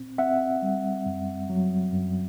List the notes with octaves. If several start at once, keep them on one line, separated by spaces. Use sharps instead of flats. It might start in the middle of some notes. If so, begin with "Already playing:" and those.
Already playing: A#2 C4
C4 E5 F#5
G3
F#2
F#3
F#2